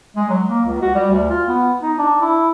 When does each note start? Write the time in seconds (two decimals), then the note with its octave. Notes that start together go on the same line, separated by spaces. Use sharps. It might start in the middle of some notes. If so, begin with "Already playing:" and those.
0.16 G#3
0.30 F#3
0.47 A#3
0.65 C#2
0.82 F#4
0.95 G3
1.10 D2
1.30 F4
1.48 B3
1.82 D#4
1.98 D4
2.21 E4